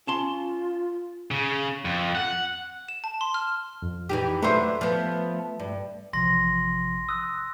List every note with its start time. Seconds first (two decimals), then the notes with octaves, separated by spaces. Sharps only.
0.07 C#4 F4 A5 C6
1.31 C#3
1.85 F2
2.15 F#5
2.88 E7
3.04 A5
3.21 C6
3.34 F6
3.82 F2
4.09 E3 D#4 G4
4.42 F#3 A3 D4 B4 C5 E5
4.81 F3 B3
5.60 G2
6.13 A1 C3 F3 C6 A#6
7.09 D#6 E6 F#6